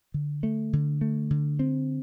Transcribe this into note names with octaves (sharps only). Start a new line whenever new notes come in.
D3
A3
D3
A3
D3
C4